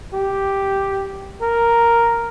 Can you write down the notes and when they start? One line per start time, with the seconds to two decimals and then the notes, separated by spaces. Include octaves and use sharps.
0.14 G4
1.42 A#4